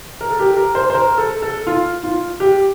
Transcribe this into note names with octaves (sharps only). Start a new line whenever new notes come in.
A#4
A4
G4
A#4
C5
C5
A#4
A4
A4
F4
F4
G4